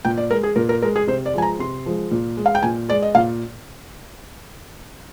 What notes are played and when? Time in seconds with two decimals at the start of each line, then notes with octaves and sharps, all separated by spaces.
0.05 A#2 G5
0.17 D5
0.30 G#3 A#4
0.43 G#4
0.56 A#2 A#4
0.69 A#4
0.82 G#3 A#4
0.96 G#4
1.07 C3 C5
1.26 D5
1.34 F3 G#3 G#5
1.42 A#5
1.59 C3 C6
1.86 F3 G#3
2.11 A#2
2.37 G#3
2.46 F5
2.55 G5
2.63 A#2 G#5
2.89 G#3 D5
3.02 D#5
3.15 A#2 F5